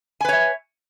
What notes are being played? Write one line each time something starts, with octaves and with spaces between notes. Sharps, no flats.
B4 C#5 E5 G#5